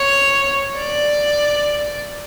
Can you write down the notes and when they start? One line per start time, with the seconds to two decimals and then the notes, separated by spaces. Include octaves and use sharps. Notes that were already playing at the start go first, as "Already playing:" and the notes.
Already playing: C#5
0.77 D5